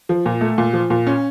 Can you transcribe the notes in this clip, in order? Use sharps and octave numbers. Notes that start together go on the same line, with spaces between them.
F3
A#2
A3
A#2
F3
A#2
C#4